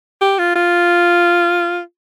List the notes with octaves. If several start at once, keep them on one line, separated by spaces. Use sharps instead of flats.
G4
F4
F4